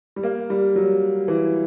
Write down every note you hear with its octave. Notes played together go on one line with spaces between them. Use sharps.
G3
A#3
G3
F#3
E3